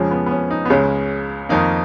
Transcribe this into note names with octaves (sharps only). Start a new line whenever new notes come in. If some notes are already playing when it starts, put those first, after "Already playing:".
Already playing: F2 C#3 F3 G#3 C#4
B3
B3
C#4
D#4
B3
C#2 C#3 G#3 C#4
F2 D#3 A#3 D#4